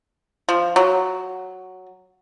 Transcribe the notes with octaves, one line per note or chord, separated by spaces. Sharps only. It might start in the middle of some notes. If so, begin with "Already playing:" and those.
F3
F#3